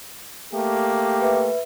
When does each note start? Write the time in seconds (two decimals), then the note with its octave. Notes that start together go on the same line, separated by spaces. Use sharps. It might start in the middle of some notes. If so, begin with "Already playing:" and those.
0.53 A3 A#3 G4
1.22 B4 E5